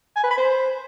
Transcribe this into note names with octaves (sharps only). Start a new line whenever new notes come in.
G#5
B4
B5
C5